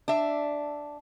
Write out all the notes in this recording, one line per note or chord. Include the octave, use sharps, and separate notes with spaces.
D4 E5